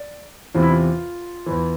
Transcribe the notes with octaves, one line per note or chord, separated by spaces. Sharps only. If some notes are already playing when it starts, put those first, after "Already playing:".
Already playing: D5
E2 C3 E3 F4
E4
F4
E2 E3